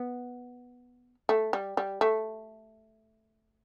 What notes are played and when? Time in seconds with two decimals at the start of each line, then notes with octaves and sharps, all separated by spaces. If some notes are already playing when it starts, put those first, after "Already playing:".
Already playing: B3
1.29 A3
1.53 G3
1.77 G3
2.01 A3